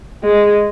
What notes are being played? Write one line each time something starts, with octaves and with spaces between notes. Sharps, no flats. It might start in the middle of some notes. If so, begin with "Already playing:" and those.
G#3